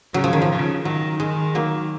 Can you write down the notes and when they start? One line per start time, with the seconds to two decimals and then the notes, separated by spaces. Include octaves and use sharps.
0.14 C#3 F#3
0.24 F3
0.33 D#3
0.42 F3
0.49 C#3
0.84 D#3 F#3
1.20 D#3 G#3
1.55 F#3 A#3